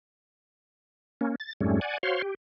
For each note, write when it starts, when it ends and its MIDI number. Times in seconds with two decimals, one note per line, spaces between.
1.21 1.35 58
1.21 1.35 61
1.40 1.53 93
1.61 1.80 41
1.61 1.80 44
1.61 1.80 55
1.61 1.80 57
1.61 1.80 61
1.81 1.98 74
1.81 1.98 78
1.81 1.98 80
2.03 2.22 66
2.03 2.22 72
2.03 2.22 73
2.03 2.22 77
2.03 2.22 84
2.22 2.34 67